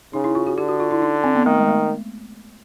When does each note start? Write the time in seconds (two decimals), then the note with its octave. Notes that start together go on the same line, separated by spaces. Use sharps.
0.13 C#3 D#4
0.24 E4
0.35 F4
0.47 F#4
0.58 D3 G4
0.68 F#4
0.80 F4
0.91 E4
1.02 D#4
1.24 C4
1.35 B3
1.46 D#3 A3
1.58 G#3
1.68 A3